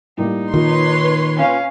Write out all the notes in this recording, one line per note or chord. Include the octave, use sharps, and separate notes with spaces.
A2 G3 A#3 D#4
A#2 D#3 B4 C#5 C6
C#4 F5